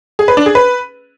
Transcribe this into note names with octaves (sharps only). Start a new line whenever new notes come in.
G#4
B4
D4
G#4
B4